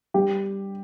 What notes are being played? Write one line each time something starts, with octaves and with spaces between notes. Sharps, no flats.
G3 G4